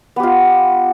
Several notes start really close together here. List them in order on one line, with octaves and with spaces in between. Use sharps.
B3 G4 F4